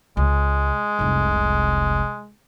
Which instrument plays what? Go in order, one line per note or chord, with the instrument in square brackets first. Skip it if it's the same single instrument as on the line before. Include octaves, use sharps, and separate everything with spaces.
[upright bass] C#2 [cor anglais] G#3
[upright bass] F1 C2